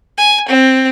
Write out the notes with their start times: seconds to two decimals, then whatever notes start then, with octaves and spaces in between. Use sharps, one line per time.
0.18 G#5
0.48 C4